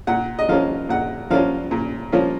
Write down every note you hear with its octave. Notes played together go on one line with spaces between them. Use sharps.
A#2 F#5
D#5
F3 A#3 C#4 F4 F5
A#2 F#5
F3 A#3 C#4 F4 F5
A#2
F3 A#3 C#4 F4